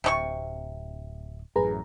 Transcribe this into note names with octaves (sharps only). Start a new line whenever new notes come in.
D1 C3 D#4 C#6
A1 F#2 A2 G#4 B4 A#5